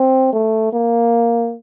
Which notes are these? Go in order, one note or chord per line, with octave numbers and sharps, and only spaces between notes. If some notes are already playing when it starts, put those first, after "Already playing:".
Already playing: C4
A3
A#3